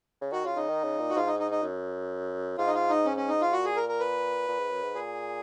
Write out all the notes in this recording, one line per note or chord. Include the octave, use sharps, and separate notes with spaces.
C#3
D#3 F#4
C#3 F4
C#3 D#4
D#3
C#3
A#2
F#4
G#2 F4
D#4
D#4
D#4
F#2
G#2 F4
D#4
F4
D#4
C#4
C#4
D#4
F4
A#2 F#4
G#4
A#4
A#4
B4
A#2
G#2
F#2
G#2
A#2 G#4